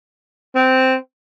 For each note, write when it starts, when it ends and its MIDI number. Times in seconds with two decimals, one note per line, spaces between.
0.55 0.95 60